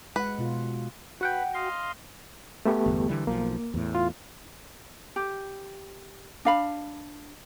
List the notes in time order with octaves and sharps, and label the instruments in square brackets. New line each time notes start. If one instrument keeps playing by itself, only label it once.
[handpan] G#3 F#5 [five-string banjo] B4
[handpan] B2 F4
[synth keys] F#4 F#5 G5 [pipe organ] B4
[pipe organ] D#5 F5 C6
[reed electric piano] A3 B3 G4
[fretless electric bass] G1 E2
D3 E3 G3
[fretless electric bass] B1 F3 [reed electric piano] A#3
[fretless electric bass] E2 A2
[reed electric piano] F4
[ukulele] G4
D4 F5 B5